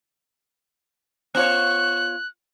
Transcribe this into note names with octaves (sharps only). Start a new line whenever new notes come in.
B3 F4 C#5 F#6